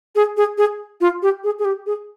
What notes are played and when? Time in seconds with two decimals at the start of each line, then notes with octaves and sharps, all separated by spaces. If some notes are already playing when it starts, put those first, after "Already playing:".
0.16 G#4
0.37 G#4
0.58 G#4
1.01 F4
1.22 G4
1.44 G#4
1.59 G#4
1.65 G4
1.86 G#4